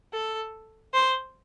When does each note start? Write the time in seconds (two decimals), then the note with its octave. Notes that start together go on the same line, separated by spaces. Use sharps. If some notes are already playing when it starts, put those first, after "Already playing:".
0.13 A4
0.93 C5